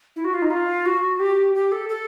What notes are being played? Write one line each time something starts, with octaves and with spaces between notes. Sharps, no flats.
E4
F#4
F4
D#4
F4
F#4
G4
G4
A4
A4